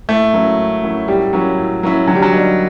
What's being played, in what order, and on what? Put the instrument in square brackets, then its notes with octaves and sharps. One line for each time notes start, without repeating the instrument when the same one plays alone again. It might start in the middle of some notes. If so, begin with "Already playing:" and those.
[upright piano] A2 [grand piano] A3
[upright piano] F#3 A#3 C#4 E4
A2
F#3 A#3 C#4 E4
[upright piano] A2 [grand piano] G3
[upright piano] F#3 A#3 C#4 E4
A2
F#3 A#3 C#4 E4
[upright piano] D3 [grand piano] F#3
[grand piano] G3
F#3
[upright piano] G3 A#3 D#4